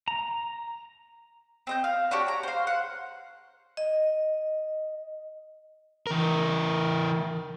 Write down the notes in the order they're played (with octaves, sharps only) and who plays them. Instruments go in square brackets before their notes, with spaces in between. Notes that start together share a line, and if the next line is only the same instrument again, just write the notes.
[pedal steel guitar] A#5
[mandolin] C4 D#5 G6
F5
D4 F#4 G4 C#5
C#5 A#5
C5 F5
F#5
[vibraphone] D#5
[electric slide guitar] E3 A#4